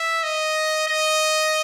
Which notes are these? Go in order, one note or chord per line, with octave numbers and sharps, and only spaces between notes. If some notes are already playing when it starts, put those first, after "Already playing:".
Already playing: E5
D#5
D#5